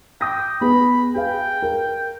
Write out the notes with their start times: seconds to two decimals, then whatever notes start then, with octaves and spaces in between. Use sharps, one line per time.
0.21 G5 D6 D#6 A#6
0.61 B3 G#4 B4 B5
1.15 G#4 B4 F5 G5
1.62 A#4